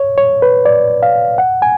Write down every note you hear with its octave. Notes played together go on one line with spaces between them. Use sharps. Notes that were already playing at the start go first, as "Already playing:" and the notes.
Already playing: C#5
C#5
B4
D5
F5
F#5
G#5